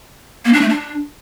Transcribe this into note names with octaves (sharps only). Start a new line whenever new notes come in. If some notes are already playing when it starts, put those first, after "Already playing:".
A#3
D4
A3
D4